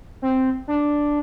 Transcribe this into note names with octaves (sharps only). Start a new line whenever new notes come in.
C4
D4